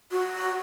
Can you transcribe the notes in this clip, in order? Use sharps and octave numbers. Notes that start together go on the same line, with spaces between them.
F#4